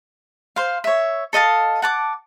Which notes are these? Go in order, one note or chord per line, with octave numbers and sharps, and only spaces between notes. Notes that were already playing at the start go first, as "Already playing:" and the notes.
C5 F5
C#5 E5
A4 D#5 F5 A5
F#5 A5 D6